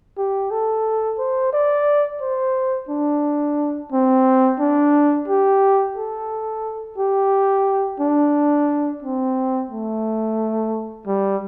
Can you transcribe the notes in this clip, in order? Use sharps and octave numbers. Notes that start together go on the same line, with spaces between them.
G4
A4
C5
D5
C5
D4
C4
D4
G4
A4
G4
D4
C4
A3
G3